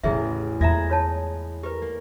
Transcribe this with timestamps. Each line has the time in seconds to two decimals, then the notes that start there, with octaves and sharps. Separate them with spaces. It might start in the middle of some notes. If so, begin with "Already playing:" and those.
0.04 A1 E2 C#3 C#4 E4 G#4 E5
0.61 E2 G#3 F4 E5 A#5 G#6 A#6
0.90 F4 C#5 A5
1.63 G4 A#4 B4
1.82 A#3